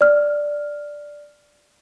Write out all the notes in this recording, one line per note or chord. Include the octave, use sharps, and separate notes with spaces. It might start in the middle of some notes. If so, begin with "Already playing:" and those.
D5 F6